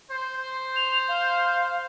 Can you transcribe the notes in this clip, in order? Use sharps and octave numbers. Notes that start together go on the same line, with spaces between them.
C5
F7
F5